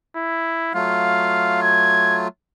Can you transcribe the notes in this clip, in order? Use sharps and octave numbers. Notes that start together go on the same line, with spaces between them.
E4
F#3 A3 F4 F5
G#6